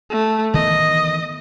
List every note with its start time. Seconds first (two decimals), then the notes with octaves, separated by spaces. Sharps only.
0.10 A3
0.54 D#3 E3 B3 D#5